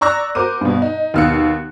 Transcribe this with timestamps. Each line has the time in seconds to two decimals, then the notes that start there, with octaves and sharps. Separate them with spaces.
0.01 D5 A#5 C#6 E6 F#6 A#6
0.35 F#4 A#4 C5 D6 D#7
0.61 G2 B2
0.82 D#4
1.14 D#2 B2 F5 E6 F#6 C#7